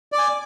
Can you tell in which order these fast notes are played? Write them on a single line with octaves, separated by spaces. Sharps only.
D5 D6 G#5